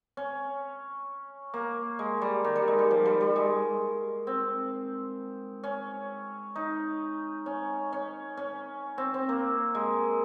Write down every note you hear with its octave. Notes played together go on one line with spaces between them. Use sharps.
C#4
A#3
G#3
G3
D#3
G3
G#3
G3
F3
G3
G3
G#3
C4
C#4
D#4
C#4
C#4
C#4
C4
C4
A#3
G#3